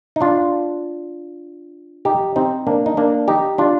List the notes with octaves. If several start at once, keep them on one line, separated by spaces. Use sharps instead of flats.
D#4
D4 F4
D#4 G4
C4 D#4
A#3 D4
D#4
A#3 D4
D#4 G4
D4 F4